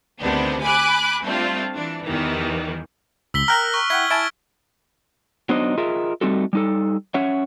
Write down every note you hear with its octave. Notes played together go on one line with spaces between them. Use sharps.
D2 C3 D#3 B3 D4
G#5 B5 D6 F#6
G3 A3 C4 D4 F4
E3 D4
E2 D#3 E3 G3
C#2 E6 B6 G7
A#4 G5 A#5 F6 F#6
C#6 F#6
E4 F#5 G5 G#6 B6 G7
E4 G#5 A5 D7
F#3 B3 D4 D#4 C5 D#5
F4 G#4 A#4 D#5 E5
G3 A3 C4 D#4 F#4 A4
G3 D#4 A4
C#4 C#5 E5 F#5